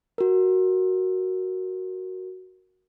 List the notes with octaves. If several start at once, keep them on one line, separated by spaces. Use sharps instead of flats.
F#4 A#4